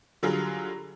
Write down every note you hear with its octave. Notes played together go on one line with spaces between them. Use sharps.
D3 F#3 G3 F4 G#4